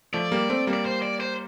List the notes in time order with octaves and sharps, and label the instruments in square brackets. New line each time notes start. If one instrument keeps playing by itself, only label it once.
[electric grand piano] F3 A3 [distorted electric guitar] D5
[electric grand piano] G3 A#3
A3 C4
G3 A#3
[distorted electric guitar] D5
C5
D5
C5